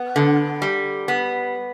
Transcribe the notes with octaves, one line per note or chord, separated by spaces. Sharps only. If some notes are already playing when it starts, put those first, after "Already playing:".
Already playing: B3
D3
G3
B3